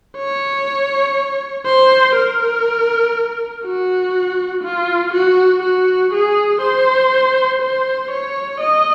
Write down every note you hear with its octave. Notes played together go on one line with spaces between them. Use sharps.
C#5
C5
A#4
F#4
F4
F#4
F#4
G#4
C5
C5
C#5
D#5